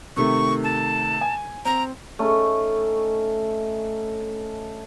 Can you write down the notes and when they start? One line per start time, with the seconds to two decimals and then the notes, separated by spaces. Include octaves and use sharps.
0.17 C3 D#3 A3 C#6
0.63 A5
1.21 G#5
1.65 C4 A#5
2.19 A3 C#4 D#4